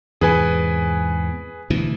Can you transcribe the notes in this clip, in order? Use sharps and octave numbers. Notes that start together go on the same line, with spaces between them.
E2 G#2 C3 G#4 B4 G#5
D2 B2 E3